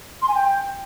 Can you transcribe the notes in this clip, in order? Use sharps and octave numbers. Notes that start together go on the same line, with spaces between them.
C6
G#5
G5